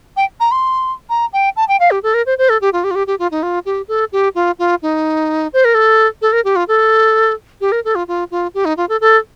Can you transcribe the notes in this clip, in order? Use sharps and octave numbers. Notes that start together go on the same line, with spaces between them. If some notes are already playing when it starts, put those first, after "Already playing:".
G5
A#5
C6
A#5
G5
A5
G5
F5
G4
A4
A#4
C5
C5
A4
G4
F4
G4
F4
G4
G4
F4
D#4
F4
G4
A4
G4
F4
F4
D#4
C5
A#4
A4
A4
A#4
G4
F4
A4
G4
A#4
A4
F4
F4
F4
G4
D#4
F4
A4
A4